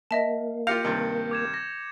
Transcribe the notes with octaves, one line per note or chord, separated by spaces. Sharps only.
A#3 D#5 E5 A5
F4 G4 F5 G6 A#6 C#7 F7
G2 C3 D#3
D6 G#6 E7
A#6